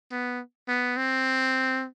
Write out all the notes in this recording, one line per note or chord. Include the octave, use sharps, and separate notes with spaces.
B3
B3
C4